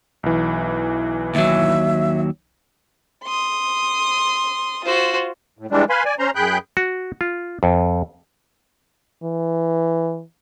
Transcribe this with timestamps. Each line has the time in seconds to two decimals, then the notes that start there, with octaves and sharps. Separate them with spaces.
0.23 B1 E3
1.35 D#2 F#3 E5
3.24 C6 D#6
4.85 F4 F#4 C5
5.59 A2
5.71 E3 G3 G#3 D4
5.90 B4 F5 G#5 B5 C6
6.05 D5 G#5
6.19 C#4 C5 A#5 C6
6.35 F#2 G#4 G5 B5 F#6 G6
6.77 F#4
7.21 F4
7.63 F2
9.23 E3